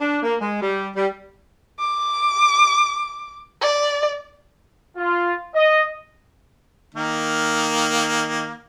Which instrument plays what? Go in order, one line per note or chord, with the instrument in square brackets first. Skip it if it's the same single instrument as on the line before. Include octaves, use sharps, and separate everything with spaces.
[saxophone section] D4
A#3
G#3
G3
G3
[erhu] D6
D5
[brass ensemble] F4
D#5
[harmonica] D#3 A#3